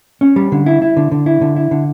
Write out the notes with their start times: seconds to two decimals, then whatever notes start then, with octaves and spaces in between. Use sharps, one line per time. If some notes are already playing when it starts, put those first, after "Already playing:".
0.21 C#4
0.36 G3
0.52 D3
0.66 E4
0.82 E4
0.97 D3
1.12 D3
1.26 E4
1.41 D3
1.56 E4
1.71 D3